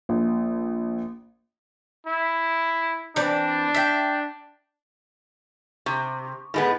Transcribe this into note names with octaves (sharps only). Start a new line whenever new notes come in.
A#1
E4
E3 C4 D4 D5
E5 G5
C3 C#6
A2 G#3 B3